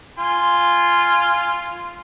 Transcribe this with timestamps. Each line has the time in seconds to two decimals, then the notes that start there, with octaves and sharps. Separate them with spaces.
0.19 F4 G#5 C6